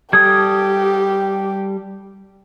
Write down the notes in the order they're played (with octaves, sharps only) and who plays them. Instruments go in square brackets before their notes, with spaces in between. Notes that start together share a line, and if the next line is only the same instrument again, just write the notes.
[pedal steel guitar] G3 A4 D#6 [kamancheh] G4 [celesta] G#6